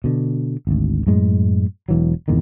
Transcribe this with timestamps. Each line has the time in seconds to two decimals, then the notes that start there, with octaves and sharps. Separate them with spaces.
0.04 B2 D3
0.67 G#1 D2
1.07 F#2 A2 G#3
1.89 E1 E3 F#3
2.28 G#1 E2 A#2 D#3